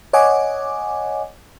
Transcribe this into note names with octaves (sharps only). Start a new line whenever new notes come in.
C#5 D#5 F#5 G#5 D6